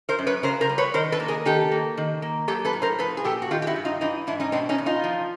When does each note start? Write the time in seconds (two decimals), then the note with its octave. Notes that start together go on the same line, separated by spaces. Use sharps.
0.09 A#4 C5
0.19 F#2
0.27 B4 C#5
0.43 C#3 A#4 C5
0.61 A#4 C5
0.69 G3
0.78 B4 C#5
0.94 D#3 A#4 C5
1.12 A4 B4
1.20 A#3
1.28 G#4 A#4
1.45 D#3 G4 A4
1.72 A#3
1.98 D#3
2.22 A#3
2.48 F#3 G4 A4
2.65 A4 B4
2.73 A2
2.82 A#4 C5
2.99 F3 A4 B4
3.17 G#4
3.25 A#2 G4 A4
3.42 F#4
3.51 D#3 F4 G4
3.62 G4
3.67 E4 F#4
3.76 G2
3.85 D#4 F4
4.01 E3 D#4 F4
4.27 G#2 D4 E4
4.40 C#4 D#4
4.52 B2 C4 D4
4.69 C#4 D#4
4.78 E2
4.86 D#4 F4
5.04 F3